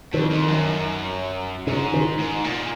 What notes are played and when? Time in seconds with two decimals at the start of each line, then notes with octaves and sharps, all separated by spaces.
0.13 F2 D#3
0.30 F2
0.48 F#2
1.67 G#2 C#3
1.93 D#3
2.18 G#2
2.44 A#2